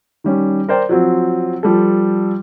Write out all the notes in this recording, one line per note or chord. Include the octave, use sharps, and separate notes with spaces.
D#3 G3 C#4
A#4 C5 D5 G5
F3 F#3 C4
F3 G3 A4